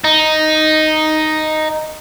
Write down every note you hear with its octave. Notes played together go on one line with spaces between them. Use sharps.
D#4